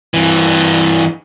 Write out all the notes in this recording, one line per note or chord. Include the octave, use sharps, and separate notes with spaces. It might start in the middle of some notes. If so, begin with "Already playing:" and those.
G2 E3